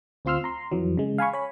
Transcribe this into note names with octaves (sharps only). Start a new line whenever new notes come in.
D2 C4 F4 C6 E6 F6
A#5 C6
F2 E3 F#3
C#3 G#3
F5 G#5 B5 C#6
C#5 G#5 B5